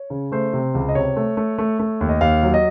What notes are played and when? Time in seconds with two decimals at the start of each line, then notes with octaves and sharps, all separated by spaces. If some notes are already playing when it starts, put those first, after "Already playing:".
Already playing: C#5
0.10 C#3
0.32 A3 C5
0.53 C3
0.75 C#2
0.89 D#5
0.95 C3 C#5
1.16 A3
1.37 A3
1.58 A3
1.79 A3
2.01 D#2
2.09 D#5
2.21 D#2 F5
2.43 F#3
2.54 D#5